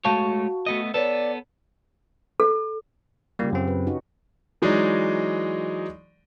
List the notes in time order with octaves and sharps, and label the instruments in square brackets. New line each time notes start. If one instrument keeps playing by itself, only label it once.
[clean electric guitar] G#3 A3 C#5 [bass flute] F#4 [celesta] F5 A5 C#6
[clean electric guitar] A3 B3 D#5
[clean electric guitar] B3 A4 [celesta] B4 C#5 [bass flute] D5
[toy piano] A4
[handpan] C#3 F4 G4 [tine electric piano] G3 A#3
[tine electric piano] F#2 C4
[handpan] B4
C#4 D#4 F#4
[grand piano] E3 F#3 G#3 D#4 D5